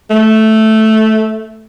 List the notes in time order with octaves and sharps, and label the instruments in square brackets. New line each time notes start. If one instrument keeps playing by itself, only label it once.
[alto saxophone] A3